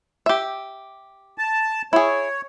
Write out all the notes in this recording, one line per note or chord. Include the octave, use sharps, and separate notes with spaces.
G4 E5
A5
E4 G#4 C#5